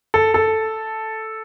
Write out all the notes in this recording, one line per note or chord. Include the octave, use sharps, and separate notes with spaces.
A4
A4